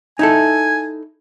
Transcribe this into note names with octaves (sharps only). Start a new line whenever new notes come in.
D#4 E4 A4 G#5